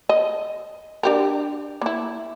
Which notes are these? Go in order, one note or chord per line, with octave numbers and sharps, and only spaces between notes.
D#5
D4 G4 A#4
A#3 E4